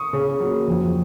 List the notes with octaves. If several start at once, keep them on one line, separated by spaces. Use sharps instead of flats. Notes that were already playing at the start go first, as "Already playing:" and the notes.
Already playing: C#6 D#6
C#3
F#3 A#3
F2